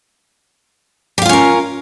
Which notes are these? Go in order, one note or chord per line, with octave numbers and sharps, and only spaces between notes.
C#4 F4 G4 A#4 F5